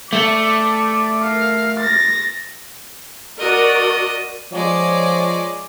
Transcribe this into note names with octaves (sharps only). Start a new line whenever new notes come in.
A3 D5
A#4 F5
A6 A#6
F#4 A#4 D5 D#5
F3 G#3 C#5 D5